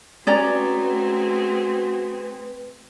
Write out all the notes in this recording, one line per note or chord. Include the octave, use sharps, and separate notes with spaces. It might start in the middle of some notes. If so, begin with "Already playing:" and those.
A3 C4 C#4 F#4 G#4 B4 D5 A#5